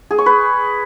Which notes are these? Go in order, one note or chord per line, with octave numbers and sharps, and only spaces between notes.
G#4
C#6
B4